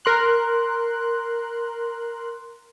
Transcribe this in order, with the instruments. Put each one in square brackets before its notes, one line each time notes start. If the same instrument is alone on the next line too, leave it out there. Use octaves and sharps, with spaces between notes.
[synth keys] A#4 C6 F#6